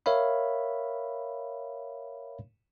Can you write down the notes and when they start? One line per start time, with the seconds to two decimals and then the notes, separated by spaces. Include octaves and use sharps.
0.06 A#4 C#5 E5 F5 B5